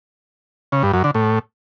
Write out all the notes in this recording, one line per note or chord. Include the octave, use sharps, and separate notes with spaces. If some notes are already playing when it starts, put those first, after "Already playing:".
C#3
G2
F#2
D3
A2